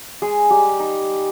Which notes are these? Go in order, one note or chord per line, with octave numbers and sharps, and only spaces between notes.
G#3 G#4
G3 G4
D#4